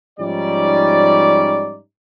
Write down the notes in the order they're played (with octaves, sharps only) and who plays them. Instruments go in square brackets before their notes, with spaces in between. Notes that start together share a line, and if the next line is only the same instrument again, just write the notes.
[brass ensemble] G#2 F3 G3 C#4 D#4 D5